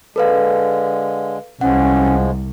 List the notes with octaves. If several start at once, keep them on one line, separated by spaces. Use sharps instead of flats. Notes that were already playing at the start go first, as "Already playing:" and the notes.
D3 G#3 A4 B4 F5
C2 F3 G#3 C#4 F#5